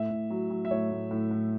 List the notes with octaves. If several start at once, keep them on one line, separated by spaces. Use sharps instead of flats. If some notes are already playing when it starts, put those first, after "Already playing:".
Already playing: A2 E5
A2
F#3
F#3
E5
A2 C#5
A2
A2
A2